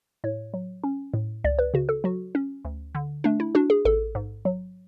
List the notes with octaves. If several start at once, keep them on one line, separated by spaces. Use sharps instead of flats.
A2 C#5
F#3
C#4
A2
C#2 D5
B4
C#3 F#4
A4
F#3 F#4
C#4
D2
D3
A3 D4
E4
D4 F#4
G#4
A1 A4
G#2
F#3